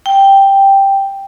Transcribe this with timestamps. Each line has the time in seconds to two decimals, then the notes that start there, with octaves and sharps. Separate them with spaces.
0.06 G5